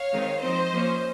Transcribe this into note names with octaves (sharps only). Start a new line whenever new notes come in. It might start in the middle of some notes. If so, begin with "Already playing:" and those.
Already playing: C#5 F5
D#3 G#3 C4 D#4
F3 C4 D#4 C5 D#5
F3 A#3 C#4